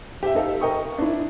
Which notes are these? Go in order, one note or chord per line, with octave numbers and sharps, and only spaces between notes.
G4 E5
D#4 A4 F5
A#4 D#5 G5 C#6 D#6
D4 E4